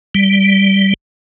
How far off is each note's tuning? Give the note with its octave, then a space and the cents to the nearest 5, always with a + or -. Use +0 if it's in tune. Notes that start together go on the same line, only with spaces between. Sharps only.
G3 -5